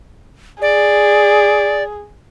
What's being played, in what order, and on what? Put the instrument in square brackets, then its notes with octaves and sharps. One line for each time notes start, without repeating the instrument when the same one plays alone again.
[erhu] G#4 [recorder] D5